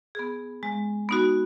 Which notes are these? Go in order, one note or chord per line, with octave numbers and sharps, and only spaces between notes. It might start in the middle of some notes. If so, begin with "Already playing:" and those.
B3 G#4
G#3
B3 D#4 F#4